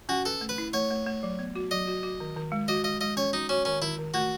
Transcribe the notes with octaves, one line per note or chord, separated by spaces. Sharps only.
C#4 F#4
A4 B4
A3
B4
E4
A3 C#5
A3
A3
F#3
B3
F#4
F#3 D#5
F#4
F#4
D#3
D#3
G#3
F#4 D#5
G#3 D#5
G#3 D#5
C#4 C#5
D#4 F#4
C#4 F#4
D#3 C#4
D#3 E4
D#3
A3 F#4